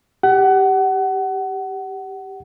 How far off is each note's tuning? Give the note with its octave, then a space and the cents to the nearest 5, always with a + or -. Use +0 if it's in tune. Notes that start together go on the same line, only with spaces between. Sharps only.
G4 +0 F#5 +25